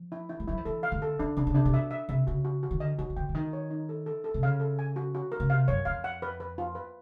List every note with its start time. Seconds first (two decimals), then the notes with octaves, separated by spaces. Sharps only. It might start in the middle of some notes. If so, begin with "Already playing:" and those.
Already playing: F3
0.12 E4
0.29 E4
0.40 G3
0.48 F#3 E4
0.57 F3
0.65 E3 A4
0.83 F5
0.92 D3
1.02 A4
1.19 D3 D4
1.37 C#3 D4
1.47 C#3
1.55 C3 D4
1.65 C3
1.74 B2 E5
1.91 E5
2.09 C3 E5
2.27 C#3 F#4
2.45 F#4
2.63 F#4
2.71 D#3
2.80 D3 D#5
2.99 D#3 F#4
3.10 D#3
3.16 D3 G5
3.29 D3
3.35 D#3 D#4
3.53 C#5
3.70 D#4
3.89 A4
4.06 A4
4.24 A4
4.34 C3
4.43 C#3 F5
4.60 A4
4.79 G#5
4.96 F#4
5.15 F#4
5.32 A#4
5.40 C#3
5.50 C3 F5
5.68 F#2 C#5
5.85 F2 F5
6.04 F#5
6.22 B4
6.40 B4
6.58 F4
6.75 B4